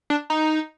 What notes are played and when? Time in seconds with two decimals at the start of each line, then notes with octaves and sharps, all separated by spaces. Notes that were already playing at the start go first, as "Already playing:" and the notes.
0.10 D4
0.30 D#4